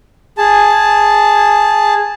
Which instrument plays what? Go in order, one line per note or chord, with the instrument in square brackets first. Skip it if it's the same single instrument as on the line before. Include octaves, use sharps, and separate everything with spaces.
[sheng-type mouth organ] G#4 A5